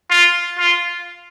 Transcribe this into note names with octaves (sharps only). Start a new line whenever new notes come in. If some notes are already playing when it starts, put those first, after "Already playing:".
F4
F4